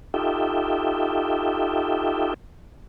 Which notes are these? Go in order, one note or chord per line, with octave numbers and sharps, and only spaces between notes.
D#4 F4 G4 A4 E5 G5